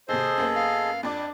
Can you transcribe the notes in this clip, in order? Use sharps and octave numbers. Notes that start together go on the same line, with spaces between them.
D#2 C3 G#4 A4 C5 D#5
F#2 A#3 B3
F5
F2 D4 D5 D6